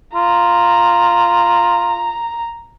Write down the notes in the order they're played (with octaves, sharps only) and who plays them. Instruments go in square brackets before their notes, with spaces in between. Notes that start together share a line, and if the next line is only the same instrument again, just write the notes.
[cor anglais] F4 [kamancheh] A#5